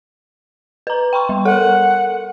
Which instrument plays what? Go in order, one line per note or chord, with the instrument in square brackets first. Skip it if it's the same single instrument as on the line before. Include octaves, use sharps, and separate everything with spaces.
[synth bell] B4 A#5
G5 C6 C#6
G3
[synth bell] A4 A#4 [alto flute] F#5